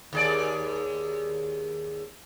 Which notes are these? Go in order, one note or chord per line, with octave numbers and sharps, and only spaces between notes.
D#2 G#4 D5